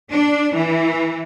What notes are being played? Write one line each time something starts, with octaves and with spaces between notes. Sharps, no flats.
D4
E3